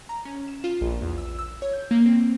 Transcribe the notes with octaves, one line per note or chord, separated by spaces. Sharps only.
A#5
C#4
E7
F4
A#1
E2
E6
E6
C#5
G6
A#3
C4